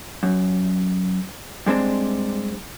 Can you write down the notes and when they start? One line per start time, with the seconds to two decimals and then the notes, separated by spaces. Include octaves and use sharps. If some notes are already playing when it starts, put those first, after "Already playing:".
0.23 F#2
1.66 G2 G#3 C4 D4